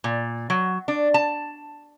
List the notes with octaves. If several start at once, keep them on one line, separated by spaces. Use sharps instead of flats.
A#2
F#3
D4
A5